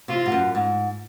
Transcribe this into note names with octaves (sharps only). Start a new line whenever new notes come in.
C3 F4
G#2
F#2
G#2